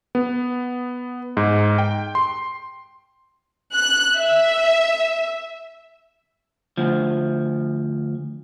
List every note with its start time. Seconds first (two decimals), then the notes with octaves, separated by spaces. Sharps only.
0.15 B3
1.37 G#2
1.78 G5
2.15 C6
3.74 F#6
4.16 E5
6.77 D2 F3